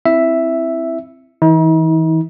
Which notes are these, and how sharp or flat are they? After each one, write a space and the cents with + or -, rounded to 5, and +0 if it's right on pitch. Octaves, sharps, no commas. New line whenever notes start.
C4 +0 E4 +0 E5 +0
E3 -30 D#4 +45